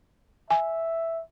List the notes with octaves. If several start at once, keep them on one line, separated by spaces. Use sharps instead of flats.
E5 G#5